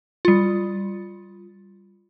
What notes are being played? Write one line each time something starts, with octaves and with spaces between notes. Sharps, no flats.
G3 F4